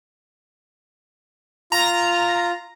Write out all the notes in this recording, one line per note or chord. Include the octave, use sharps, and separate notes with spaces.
F4 A#5